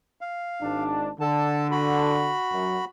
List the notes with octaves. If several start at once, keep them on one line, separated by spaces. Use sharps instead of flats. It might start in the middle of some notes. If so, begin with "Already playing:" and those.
F5
G#1 G#2 D4
D3 A4 A5
F#4 B5
F#2